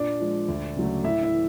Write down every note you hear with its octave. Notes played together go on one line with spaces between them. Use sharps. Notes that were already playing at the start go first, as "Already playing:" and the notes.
Already playing: A#2 D4 D5
F3 G#3
D2
C#3 F#3 A3
A2 E4 E5
E4 E5
E3